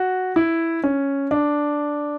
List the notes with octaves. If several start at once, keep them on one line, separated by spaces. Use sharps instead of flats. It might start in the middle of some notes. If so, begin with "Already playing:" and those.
Already playing: F#4
E4
C#4
D4